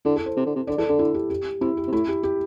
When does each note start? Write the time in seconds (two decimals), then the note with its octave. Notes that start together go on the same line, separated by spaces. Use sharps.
0.05 D3 E4
0.16 A4
0.26 C5
0.36 C3
0.46 D3
0.56 C3
0.67 D3 D5
0.78 E3 A4
0.88 D3 A4
0.99 E4
1.14 G4
1.30 G4
1.61 C3 E4
1.77 G4
1.87 C3
1.92 A2 E4
2.08 G4
2.23 G4